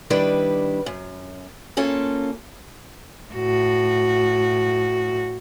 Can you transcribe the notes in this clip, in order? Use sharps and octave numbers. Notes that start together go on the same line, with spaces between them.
D#3 G3 D4 E4 B4
F#2
A#3 C#4 F4 A4
A2 F#4